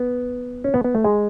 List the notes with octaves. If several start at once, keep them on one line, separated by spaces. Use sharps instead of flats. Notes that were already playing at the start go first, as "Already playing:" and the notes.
Already playing: B3
C#4
B3
B3
A3
G#3